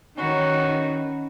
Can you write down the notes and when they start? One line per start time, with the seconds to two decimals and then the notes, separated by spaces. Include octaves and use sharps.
0.17 D#3 C#4 F#4 B4 A#5